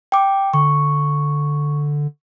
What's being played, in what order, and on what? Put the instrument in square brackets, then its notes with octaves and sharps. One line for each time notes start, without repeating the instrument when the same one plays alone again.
[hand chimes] G5 D6
[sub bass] D3 [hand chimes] C#6